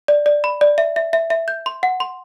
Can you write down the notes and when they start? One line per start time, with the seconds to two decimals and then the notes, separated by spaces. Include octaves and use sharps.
0.08 D5
0.26 D5
0.44 B5
0.61 D5
0.78 E5
0.96 E5
1.13 E5
1.30 E5
1.48 G6
1.66 C6
1.83 F#5
2.00 C6